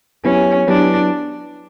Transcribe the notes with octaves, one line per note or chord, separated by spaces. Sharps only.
F#3 B3 C#4 E4 G4 B4
F#3 B3 D4 E4 G4 B4